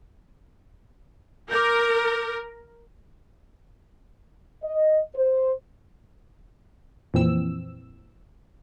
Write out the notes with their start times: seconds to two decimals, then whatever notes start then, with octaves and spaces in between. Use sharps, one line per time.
1.51 A#4 D6 G6
4.63 D#5
5.16 C5
7.14 F2 A#2 E3 C4 E6